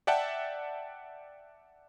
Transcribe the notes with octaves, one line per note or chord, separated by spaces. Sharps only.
D5 E5 F#5 G5 A5